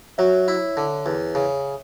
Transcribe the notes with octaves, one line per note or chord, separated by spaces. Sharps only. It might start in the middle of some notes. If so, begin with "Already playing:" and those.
F#3 C#5 E5
E4
D3
E2
C#3